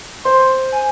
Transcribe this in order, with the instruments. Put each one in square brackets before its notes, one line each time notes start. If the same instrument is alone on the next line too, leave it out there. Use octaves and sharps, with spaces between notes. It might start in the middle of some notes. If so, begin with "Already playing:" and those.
[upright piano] C5 [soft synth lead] C6
[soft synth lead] G#5